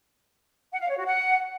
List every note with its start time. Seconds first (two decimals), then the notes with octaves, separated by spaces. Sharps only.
0.72 F#5
0.81 F5
0.89 C#5
0.98 F#4
1.06 F#5